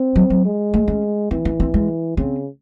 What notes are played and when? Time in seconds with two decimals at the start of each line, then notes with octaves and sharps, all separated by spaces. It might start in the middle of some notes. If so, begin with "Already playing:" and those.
Already playing: C4
0.16 F#3
0.30 F#3
0.45 G#3
0.74 A3
0.88 C#4
1.31 E3 C4
1.45 C#4
1.60 C4
1.74 G#3
2.17 C#3 C4